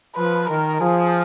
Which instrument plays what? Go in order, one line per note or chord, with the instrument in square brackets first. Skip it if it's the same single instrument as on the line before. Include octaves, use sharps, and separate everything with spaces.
[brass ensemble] F3 [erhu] B4
[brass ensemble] D#3 [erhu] A#4
[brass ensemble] F3 [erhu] G#4